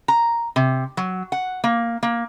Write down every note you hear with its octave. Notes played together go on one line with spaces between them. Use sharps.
A#5
C3
F#3
F#5
A#3
A#3